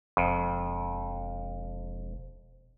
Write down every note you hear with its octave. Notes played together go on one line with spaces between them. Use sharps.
E1 F2